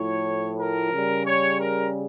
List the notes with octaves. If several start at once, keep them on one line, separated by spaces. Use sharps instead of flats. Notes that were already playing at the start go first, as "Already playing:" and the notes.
Already playing: A2 F3 C#5
A#4
C#3 G3
C#5
A#4